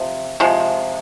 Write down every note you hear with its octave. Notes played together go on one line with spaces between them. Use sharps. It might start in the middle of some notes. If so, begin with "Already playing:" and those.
Already playing: C3 F3
C3 F3 G#3